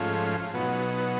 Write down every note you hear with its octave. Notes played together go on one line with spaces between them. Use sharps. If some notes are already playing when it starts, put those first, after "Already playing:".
Already playing: G#2 F3 A3 C#4 F4
B2 F#3 B3 D#4